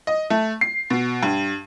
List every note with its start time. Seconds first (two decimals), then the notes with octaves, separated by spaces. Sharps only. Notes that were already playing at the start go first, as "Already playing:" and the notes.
0.07 D#5
0.30 A3
0.61 C7
0.90 B2
1.23 G2